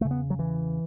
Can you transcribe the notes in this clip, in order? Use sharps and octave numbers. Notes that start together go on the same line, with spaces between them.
E2 C#3 A3
B3
F#3
E3